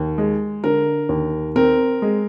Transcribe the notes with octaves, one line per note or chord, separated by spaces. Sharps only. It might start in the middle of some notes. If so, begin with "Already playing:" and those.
Already playing: D#2
G#3
D3 A#4
D#2
C4 A#4
G#3